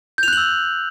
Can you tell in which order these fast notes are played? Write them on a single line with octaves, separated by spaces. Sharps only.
G6 F7 F#6 F#7 E6